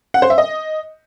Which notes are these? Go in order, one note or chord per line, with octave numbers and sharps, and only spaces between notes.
F#5
C5
E5
D#5